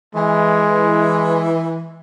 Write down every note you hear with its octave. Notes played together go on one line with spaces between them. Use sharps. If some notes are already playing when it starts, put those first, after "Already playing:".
E3 G#3